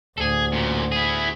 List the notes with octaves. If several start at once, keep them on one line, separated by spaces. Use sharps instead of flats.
D2 A2 G#4 A4
F#2 A#2
E4 G#4